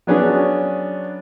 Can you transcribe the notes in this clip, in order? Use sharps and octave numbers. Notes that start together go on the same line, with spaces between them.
F#3 B3 C#4 D4 G#4